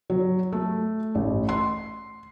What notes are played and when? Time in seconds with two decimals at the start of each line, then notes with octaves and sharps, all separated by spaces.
0.10 F#3
0.52 A3
1.15 A1
1.49 C6